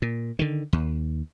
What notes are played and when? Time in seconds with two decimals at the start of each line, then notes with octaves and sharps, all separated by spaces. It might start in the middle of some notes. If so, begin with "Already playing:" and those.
0.02 A#2
0.39 D3 D#3
0.73 D#2